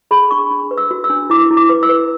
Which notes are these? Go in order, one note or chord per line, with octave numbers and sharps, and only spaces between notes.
G#4 B5
D4 C#6
D4
B4
E6
F#4
E6
D4
E4 D6
E4
D6
B4
E6
B4